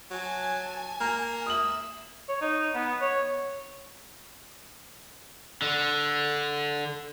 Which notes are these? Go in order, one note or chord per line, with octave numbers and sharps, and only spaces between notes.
F#3 G#5 A5 G#6
A#3 A#5
E5 D#6 E6 F#7
C#5
D#4
B3
C#5
D3